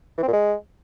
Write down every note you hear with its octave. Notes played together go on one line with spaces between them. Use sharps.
E3
C4
A#2
G#3